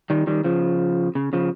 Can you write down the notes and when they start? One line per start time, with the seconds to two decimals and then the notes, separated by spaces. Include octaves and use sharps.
0.10 D#3 G3
0.27 D#3 G3
0.44 C#3 F3
1.15 C#3
1.33 C#3 F3